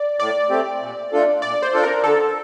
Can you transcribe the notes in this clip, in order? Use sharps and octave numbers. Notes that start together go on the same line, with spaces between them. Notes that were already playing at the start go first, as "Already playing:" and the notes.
Already playing: D5
A2 D5
A3 C4 G4
A#2
A3 D4 F4 A4
A#2 D5
C5
A3 D4 F4 A4
A#4
D3 A4